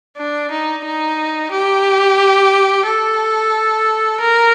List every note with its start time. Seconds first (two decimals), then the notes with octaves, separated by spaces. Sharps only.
0.17 D4
0.51 D#4
0.85 D#4
1.51 G4
2.86 A4
4.20 A#4